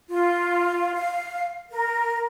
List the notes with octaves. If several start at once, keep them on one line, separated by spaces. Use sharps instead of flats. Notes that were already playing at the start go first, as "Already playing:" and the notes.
F4
F5
A#4